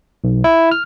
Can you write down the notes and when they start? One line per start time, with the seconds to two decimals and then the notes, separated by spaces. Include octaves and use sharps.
0.24 B1
0.44 E4
0.71 F6